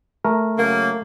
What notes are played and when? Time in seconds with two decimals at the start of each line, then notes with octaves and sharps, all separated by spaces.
0.25 A3 A#4
0.57 C#3 F#3 A#3